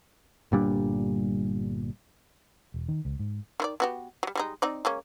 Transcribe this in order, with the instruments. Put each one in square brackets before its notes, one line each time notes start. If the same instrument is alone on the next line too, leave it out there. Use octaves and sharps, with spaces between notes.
[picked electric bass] G1 A#2 G3 D4
[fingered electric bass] E1
D#3
C#2
G#2
[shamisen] D#3 E4 D5
B3 F#4 G4
F#3 G3
G3 G#3 D#4
C4 D#4 D5
G#3 A#3 C#4